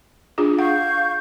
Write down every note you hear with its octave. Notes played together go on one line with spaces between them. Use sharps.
D4 F4 G#4
F5 F#5 C#6 G6